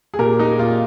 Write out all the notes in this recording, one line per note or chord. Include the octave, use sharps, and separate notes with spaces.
G#4
A#2 G4 A#4
G#3 D#4 G4
A#2 F4